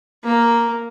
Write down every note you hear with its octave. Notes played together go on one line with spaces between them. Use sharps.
A#3